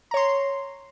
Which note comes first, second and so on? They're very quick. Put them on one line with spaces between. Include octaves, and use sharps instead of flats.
A#5 C#5 C6